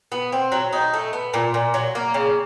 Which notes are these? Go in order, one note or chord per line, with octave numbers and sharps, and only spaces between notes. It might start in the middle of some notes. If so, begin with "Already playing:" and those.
B3
C4
F#3
D#4
A3
B3
A#2
A#2
F#3
A#3
C#3